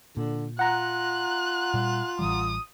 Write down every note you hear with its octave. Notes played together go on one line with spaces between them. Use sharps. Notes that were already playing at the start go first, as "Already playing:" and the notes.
A#2 D3
F4 F#5 A#5 F#6
A#2 G3
A1 E3 G3 D#6